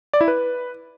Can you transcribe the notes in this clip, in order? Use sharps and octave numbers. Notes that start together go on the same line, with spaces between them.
D5
E4
B4